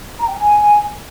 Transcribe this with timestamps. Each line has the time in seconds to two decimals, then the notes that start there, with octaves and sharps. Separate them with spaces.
0.20 A#5
0.28 G5
0.36 G#5